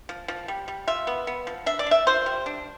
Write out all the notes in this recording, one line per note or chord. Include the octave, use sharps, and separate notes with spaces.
F3
F3
G3
G3
F4 E5
B3
B3
F3
D4 E5
D5
D4 E5
F4 C5
G3
D4